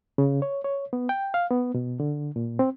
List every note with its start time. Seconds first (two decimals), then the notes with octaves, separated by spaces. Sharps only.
0.18 C#3
0.42 C#5
0.64 C#5
0.93 B3
1.09 G5
1.34 F5
1.50 B3
1.75 B2
2.00 D3
2.36 A#2
2.59 C4